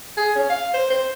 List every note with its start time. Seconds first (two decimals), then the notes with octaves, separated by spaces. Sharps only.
0.17 G#4
0.35 C#4
0.50 F5
0.74 C5
0.90 C5